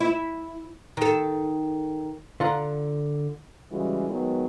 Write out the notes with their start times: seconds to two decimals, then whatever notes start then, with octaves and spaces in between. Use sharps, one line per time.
0.01 E4
0.97 D#3 A4
2.40 D3 F4 F#5 A#5
3.71 C#3 E3 G3 G#3 F#4
4.08 D#3 F#3 G#3 B3